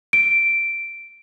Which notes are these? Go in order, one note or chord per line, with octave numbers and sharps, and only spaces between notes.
D7